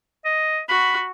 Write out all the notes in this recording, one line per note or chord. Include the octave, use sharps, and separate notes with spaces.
D#5
F#4 B5